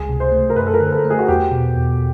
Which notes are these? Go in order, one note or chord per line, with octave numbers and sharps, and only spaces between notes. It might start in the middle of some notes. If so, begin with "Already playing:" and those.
Already playing: C#2 G#4
C3
C5
A3
A#4
F#2 B4
A4
A#4
D3
A4
A3
G#4
F#4
E2 G4
B2
E2